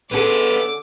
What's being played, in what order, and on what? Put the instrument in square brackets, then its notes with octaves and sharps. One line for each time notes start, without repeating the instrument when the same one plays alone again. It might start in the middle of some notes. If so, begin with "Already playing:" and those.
[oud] D3 C#4 G#4 [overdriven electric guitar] B3 A4 [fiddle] D6